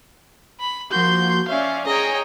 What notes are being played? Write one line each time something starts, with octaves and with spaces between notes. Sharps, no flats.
B5
F3 A#3 F#4 C6 G6
C#4 D5 E5 F5
G#4 C#5 D#5 G5 A#5